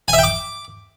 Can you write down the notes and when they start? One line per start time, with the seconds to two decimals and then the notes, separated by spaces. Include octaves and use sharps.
0.08 G#5
0.13 E5
0.18 G5
0.23 D6